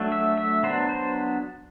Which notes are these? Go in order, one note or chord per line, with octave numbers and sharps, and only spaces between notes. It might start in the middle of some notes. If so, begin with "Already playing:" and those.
Already playing: F#3 A3 D4
E5
E5
F#3 B3 D4 C5
C5